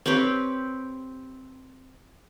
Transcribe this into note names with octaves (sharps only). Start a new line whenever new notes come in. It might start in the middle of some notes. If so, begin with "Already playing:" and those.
C4 G4 B4 C#5